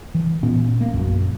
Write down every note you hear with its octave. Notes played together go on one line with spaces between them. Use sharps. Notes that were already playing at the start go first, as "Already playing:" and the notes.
E3
A#2 B3 C#4
A#3
A#1 F#2